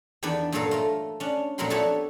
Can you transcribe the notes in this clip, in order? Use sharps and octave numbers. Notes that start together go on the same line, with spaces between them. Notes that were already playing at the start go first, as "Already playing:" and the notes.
E2 D#3 B3 D4 D5 B5
G2 A#2 F#3 A4 A#4 F5
A3 F4 A#4
C#4 D4
F2 A#2 F#3 A#4 B5 C6
B3 D4 G4 A4 C#5 E5